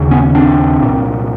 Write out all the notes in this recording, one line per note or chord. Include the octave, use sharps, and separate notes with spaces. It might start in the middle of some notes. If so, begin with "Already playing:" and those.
Already playing: D#2 C#3
B3 C#4
C4 D4
C2 A#2